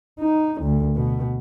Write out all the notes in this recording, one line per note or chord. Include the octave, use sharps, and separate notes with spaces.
D#4
D2
B2